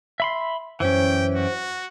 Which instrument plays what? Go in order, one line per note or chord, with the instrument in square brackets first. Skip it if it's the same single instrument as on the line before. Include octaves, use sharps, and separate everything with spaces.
[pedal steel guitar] E5 B5 C6
[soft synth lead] F#2 [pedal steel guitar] E3 C#4 [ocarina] C5 [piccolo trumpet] G5
[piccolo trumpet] F#4